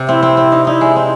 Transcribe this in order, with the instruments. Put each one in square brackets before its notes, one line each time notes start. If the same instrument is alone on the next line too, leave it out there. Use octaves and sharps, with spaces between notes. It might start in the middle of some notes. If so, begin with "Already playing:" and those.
Already playing: [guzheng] C3
[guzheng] C4 [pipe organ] E4
[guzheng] C4
C4
D#4
[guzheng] D#4 [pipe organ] E4
[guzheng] G#3
C4